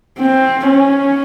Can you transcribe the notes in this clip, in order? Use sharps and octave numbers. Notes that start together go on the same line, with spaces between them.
C4
C#4